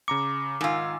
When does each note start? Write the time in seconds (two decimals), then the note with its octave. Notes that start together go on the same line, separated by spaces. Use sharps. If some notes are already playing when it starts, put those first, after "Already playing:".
0.08 C#3 A#5 D6 C#7
0.61 G#2 D#3 F4 G#5 E6